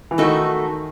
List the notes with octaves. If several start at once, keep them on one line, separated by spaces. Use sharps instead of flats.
E3
D#3 A3 D#4 F#4 A4